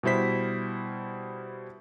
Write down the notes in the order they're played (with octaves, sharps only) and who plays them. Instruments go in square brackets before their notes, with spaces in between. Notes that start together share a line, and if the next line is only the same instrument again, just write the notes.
[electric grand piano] B2 G3 E4 C5 B6